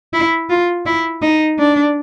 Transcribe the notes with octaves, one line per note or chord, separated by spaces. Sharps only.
E4
F4
E4
D#4
D4